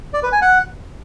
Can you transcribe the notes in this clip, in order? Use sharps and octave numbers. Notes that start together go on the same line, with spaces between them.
D5
B4
G#5
F#5